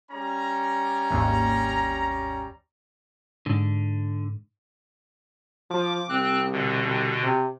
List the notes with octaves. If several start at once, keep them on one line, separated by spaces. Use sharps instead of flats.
G3 C#4 A#5
G#1 D#2
G#2 D3
F3 D6
C2 C4 F#6
B2 D3
C2
C3